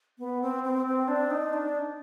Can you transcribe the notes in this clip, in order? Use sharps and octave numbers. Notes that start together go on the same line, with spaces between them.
B3
C4
C4
C4
D4
D#4
D4